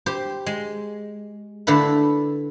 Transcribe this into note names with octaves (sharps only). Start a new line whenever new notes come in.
G4 C5
G#3
D3 A3 E4 A4 B4